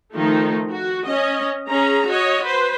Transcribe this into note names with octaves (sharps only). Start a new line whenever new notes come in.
D#3 F3 A3 D#4
F#4
C#4 D#5
C#4 G#4 A#5
F#4 C#5 D#5
B4 C5